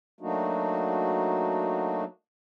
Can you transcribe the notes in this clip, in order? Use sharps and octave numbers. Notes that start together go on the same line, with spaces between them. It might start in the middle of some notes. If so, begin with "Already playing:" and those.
F#3 A3 A#3 D4 D#4 F#4